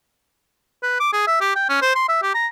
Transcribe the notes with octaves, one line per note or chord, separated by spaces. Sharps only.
B4
D6
G#4
E5
G4
G5
C#4
C5
C6
E5
G4
A#5